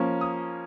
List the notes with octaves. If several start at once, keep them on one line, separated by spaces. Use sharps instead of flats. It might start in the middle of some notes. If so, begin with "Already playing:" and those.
Already playing: F3 A#3 C#4
D#6